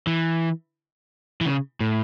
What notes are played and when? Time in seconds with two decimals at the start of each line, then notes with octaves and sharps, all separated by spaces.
0.07 E3
1.41 E3
1.46 C#3
1.80 A2